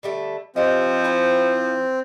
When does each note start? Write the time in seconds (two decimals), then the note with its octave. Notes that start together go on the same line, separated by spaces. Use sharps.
0.03 D3 G3 A3
0.56 F3 C4 G4 D#5
1.04 E4 G5 G#5